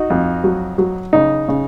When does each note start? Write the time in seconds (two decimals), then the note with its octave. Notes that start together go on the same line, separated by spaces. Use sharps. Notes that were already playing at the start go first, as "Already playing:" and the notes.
Already playing: D#4 F#4
0.10 F2
0.44 F#3
0.78 F#3
1.13 C#3 D#4
1.48 C#3